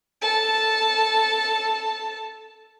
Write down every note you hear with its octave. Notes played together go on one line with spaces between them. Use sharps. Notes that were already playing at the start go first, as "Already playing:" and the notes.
A4 A5